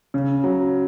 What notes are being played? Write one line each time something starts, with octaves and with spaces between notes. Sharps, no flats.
C#3
F#3